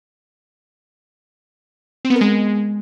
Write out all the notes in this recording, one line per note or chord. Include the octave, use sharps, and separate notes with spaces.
C4
B3
A#4
G#3